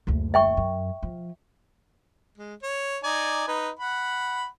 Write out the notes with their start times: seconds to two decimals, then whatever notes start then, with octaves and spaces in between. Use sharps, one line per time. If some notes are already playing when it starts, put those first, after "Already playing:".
0.07 F#1 D2
0.34 E5 G5 C#6
0.57 F#2
1.03 F3
2.38 G#3
2.63 C#5
3.04 D#4 D5 G#5
3.47 D#4 B4
3.79 F#5 B5